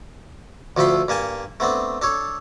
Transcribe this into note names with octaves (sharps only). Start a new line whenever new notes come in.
D2 F3 A3 A4 B5 C6
G2 A#3 G#5 A5
A3 B3 C4 D4
D4 A4 C#5